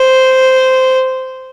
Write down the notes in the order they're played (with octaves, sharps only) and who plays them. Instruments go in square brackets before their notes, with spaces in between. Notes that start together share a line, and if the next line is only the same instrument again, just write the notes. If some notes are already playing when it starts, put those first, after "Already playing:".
Already playing: [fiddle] C5